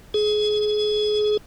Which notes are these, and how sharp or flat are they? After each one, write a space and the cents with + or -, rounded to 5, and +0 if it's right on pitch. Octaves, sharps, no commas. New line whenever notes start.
G#4 +25